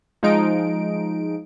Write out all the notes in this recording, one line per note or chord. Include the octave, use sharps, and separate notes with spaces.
F3 G#3 D#4 D7